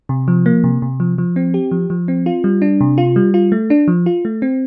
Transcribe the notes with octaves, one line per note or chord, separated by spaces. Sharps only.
C3
F3
A#3
C3
C3
F3
F3
C4
G4
F3
F3
C4
F4
G3
D4
C3
F4
G3
F4
A3
D4
F3
F4
A3
C4